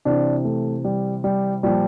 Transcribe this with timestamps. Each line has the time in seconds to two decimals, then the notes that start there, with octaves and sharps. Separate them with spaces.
0.05 C3 E3 D4
0.45 A3
0.84 G3
1.24 G3
1.63 A#2 F3 G3